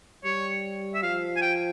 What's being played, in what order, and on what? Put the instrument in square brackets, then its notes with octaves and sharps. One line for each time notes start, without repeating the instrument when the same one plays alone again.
[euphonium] G3 [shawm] C#5
[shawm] E5
[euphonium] F3 [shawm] F5
[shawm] G#5
G5